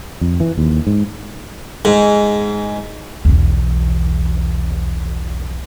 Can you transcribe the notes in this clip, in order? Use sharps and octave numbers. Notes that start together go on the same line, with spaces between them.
F2
E3
D#2
G#2
G#2
B1 E2